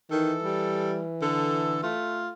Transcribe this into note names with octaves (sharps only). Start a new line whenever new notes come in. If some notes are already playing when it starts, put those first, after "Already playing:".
D#3 E3 A4
G3
D3 A4
A3 F4